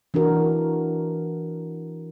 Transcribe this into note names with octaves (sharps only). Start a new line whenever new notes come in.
E3 D4 F#4 A#4